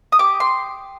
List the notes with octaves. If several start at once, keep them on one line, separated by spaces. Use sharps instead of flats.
D#6
G4 D6
C6